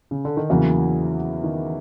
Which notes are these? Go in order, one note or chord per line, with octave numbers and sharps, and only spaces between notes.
C#3
D3
D#3
E2 C#3 E3 F#3 A#3
D#3